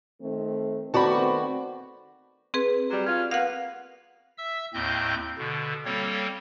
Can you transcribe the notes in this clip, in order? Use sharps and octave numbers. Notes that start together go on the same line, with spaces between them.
D#3 A3 C4
D#3 A3 B3 C4 F#4 D5 A5 B5
C4 G#4 B4
F#3 G3
C#4 F4
A#3 B3 B4 F5 F#5
E5 E6
D#2 A2 C4 D#5 G6
B2 D3
G3 A#3 C4 A4 C#5